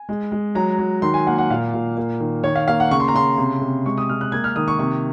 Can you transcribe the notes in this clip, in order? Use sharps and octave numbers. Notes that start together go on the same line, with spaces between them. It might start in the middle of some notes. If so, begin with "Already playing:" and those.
Already playing: G#5
G#3
G#3
F#3 A#5
F#3
D#3 C6
G#5
A#3 F#5
F#5
A#2 F5
A#2
A#3
D#3
D#3 C#5
F5
A#3 F5
F#5
C#3 C#6
C6
A#5
C#3 C6
C3
C3
G#3 C#6
D#6
G#3 F6
F#6
A#3 G#6
F6
D#3 D#6
C#6
C3 C#6